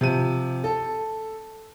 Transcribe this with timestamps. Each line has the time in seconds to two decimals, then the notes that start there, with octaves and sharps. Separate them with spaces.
0.01 C3 F3 D#7
0.64 A4